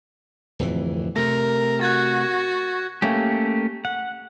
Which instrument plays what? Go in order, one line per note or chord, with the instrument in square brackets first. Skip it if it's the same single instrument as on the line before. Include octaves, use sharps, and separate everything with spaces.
[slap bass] D1 F2 E3
[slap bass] C3 A3 [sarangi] A#4 [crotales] A#6
[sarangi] F#4 [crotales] F#6 G#6 A6
[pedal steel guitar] A3 A#3 C#4 G4
F#5